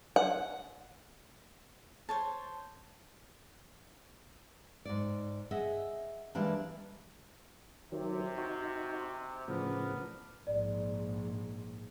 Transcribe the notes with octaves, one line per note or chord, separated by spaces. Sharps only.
F#5
C5 C#5 A5
G#2 D5
G#4 D#5 E5 F#5
E3 G3 G#3 A#3 D4
C3 D#3 F#3
D#4 F#4
A2 C#3 F3 B3 D4 A#4
A#1 G#2 D5